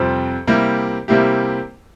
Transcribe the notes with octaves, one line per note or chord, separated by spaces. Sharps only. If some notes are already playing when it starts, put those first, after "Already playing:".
Already playing: F2 C3 G3 C4 F4
C3 G3 A#3 E4 G4
C3 G3 A#3 E4 G4